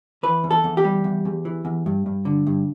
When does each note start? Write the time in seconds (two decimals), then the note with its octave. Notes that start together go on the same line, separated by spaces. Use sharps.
0.23 E3 B4
0.44 E2
0.51 A4
0.64 E2
0.77 G4
0.84 G3
1.04 E2
1.25 E2
1.45 E3
1.65 E2
1.86 G2
2.06 G2
2.25 D3
2.47 G2